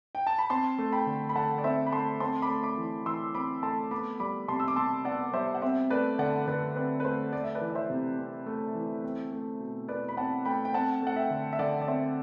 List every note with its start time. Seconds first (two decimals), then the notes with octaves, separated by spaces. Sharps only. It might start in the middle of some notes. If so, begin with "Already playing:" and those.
0.15 G5
0.27 A5
0.38 B5
0.50 C4 A5 C6
0.78 A3
0.92 G5 B5
1.07 D3
1.29 B5
1.35 D3 F#5 A5
1.58 D5
1.64 C4 C5 E5
1.87 B5
1.92 A3 A5 C6
2.20 C4 A5 C6
2.42 B5 D6
2.49 A3
2.63 B5 D6
2.77 E3
3.06 E3 C6 E6
3.34 C4 B5 D6
3.63 A3 A5 C6
3.91 B3 B5 D6
4.20 G3 B5 D6
4.48 C3 A5 C6
4.60 E6
4.68 D6
4.76 C3 A5 C6
5.05 B3 D5 F#5
5.33 G3 C5 E5
5.54 F#5
5.62 C4 C5 E5
5.90 A3 B4 D5
6.19 D3 D5 F#5
6.47 D3 B4 D5
6.76 C4 B4
7.00 B4
7.04 A3 C5
7.32 A3 D5
7.44 E5
7.55 B4 D5
7.61 E3
7.70 D5
7.75 C5 E5
7.90 C3
8.18 C4
8.46 A3
8.75 E3
9.04 C4
9.32 A3
9.60 B2
9.88 B2 B4 D5
10.09 B5
10.17 C4 F#5 A5
10.45 A3 G5 B5
10.65 G5
10.74 C4 F#5 A5
11.02 A3 F#5
11.16 E5 G5
11.30 D3
11.53 E5
11.59 D3 D5 F#5
11.81 D5
11.87 C4 C5 E5